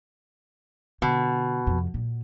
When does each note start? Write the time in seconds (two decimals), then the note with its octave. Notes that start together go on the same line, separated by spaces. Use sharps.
1.02 B2 D3
1.67 F2 C3
1.94 A#2